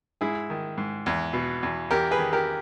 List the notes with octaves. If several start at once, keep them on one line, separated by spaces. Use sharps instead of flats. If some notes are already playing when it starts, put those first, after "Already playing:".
G#2 E4 G#4
D#3
G#2
E2
B2
E2
E2 G4 A#4
G#4 B4
D#3
G4 A#4